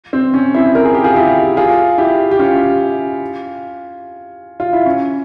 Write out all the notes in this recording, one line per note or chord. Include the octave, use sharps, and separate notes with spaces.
C4
C#4
C4 E4
A#4
G#4
G4
F4 G#4
E4 G4
F4 G#4
E4 G4
G4
C#4 F4
F4
E4
C#4